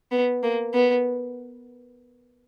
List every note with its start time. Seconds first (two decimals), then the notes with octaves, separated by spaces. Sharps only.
0.12 B3
0.43 A#3
0.74 B3